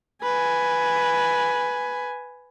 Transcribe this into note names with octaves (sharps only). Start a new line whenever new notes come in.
B4 G#5